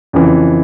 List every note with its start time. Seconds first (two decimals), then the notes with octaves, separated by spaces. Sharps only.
0.13 F2 C#3 E3